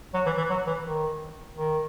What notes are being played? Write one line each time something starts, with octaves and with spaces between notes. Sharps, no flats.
F#3
E3
E3
F#3
E3
D#3
D#3